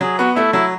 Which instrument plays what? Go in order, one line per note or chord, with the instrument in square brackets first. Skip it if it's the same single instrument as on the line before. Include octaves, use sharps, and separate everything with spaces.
[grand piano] F#3 [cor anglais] G#4
[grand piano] B3 [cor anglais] F#4
[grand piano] A3 [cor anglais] E4
[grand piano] F#3 [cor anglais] E4